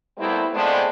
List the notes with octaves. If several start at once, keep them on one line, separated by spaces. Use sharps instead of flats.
A#2 G3 A3 B3 C4 E4
F3 G#3 A3 B3 C4 D4